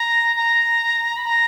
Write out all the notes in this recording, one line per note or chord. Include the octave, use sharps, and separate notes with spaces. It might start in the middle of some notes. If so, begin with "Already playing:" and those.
Already playing: A#5
A#5
B5
A#5